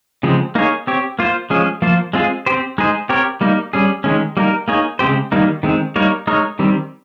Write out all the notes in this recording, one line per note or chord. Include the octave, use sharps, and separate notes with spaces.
C#3 F3 G#3 C4
A#3 D#4 G#4 C#5
C4 G4 C#5
A#3 F4 C5
F3 G#3 C#4 G#4
F3 A#3 F4 C5
G#3 C4 F4 G#4
C4 G4 C5
G#3 D#4 G#4 C5
C4 G4 A#4 C#5
G3 A#3 D#4
G3 C#4 G#4
D#3 G#3 C#4
G3 A#3 D#4 A#4
A#3 D#4 G#4 C#5
C#3 G#3 C4 G4 C5
D#3 G3 A#3 D#4
D#3 G#3 C4
G3 A#3 D#4 A#4 C#5
G#3 D#4 A#4 C#5
D#3 G3 C4